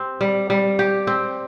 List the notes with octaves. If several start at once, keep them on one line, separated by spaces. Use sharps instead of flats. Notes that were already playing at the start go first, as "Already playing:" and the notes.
Already playing: C4 G4
G3
G3
G4
C4